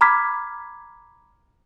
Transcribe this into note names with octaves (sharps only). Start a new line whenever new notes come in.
A#5 B5 D6 F6 G#6 B6